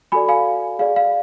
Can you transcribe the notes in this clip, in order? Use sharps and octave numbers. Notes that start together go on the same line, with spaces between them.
F#4 A4 D5 G#5 B5
F5 G#5
G#4 D5 F5
F5